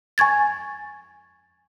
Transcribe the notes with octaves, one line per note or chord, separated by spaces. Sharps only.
G#5 C#6 G#6 A6